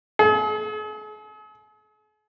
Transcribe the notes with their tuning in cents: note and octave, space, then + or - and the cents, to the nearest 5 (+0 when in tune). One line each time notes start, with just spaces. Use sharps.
G#4 +45